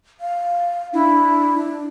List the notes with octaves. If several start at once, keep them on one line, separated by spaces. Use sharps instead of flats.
F5
D4 E4